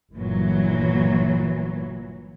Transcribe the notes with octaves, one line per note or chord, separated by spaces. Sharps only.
G1 A#2 E3 F#3